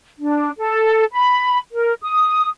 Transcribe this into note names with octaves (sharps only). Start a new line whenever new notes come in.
D4
A4
B5
A#4
D#6